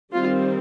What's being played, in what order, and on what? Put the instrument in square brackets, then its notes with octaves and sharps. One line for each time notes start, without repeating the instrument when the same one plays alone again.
[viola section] D#3 G3 C4 F4